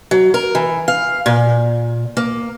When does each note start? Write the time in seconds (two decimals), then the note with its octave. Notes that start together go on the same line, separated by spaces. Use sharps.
0.11 F#3
0.34 A#4
0.55 E3
0.88 F5
1.26 A#2
2.17 A#3